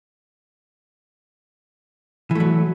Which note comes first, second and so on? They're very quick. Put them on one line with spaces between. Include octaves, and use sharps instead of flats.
E3 A3 F#3